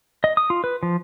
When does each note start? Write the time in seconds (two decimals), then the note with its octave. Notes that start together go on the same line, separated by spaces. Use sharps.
0.24 D#5
0.37 D#6
0.50 F4
0.64 B4
0.83 F3